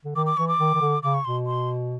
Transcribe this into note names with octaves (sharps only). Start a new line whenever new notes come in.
D3
D#3 D6
D6
E3 C#6
D6
D#3
D#3
D3
C#3 D6
C#6
B2 C6
C6